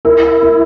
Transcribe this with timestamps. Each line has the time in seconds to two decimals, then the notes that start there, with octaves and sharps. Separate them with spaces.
0.05 E4 A#4
0.43 A#4